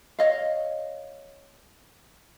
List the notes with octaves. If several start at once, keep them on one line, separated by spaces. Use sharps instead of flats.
C#5 D#5 F5